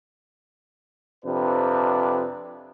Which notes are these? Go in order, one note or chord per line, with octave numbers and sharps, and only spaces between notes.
F2 C3 D4 B4